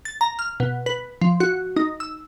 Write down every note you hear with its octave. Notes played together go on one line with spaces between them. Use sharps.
A6
A#5
F6
B2
B4
F3
F#4
D#4
E6